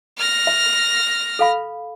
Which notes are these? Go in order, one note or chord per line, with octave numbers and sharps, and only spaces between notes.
F6 A#6
E5
A4 F5 B5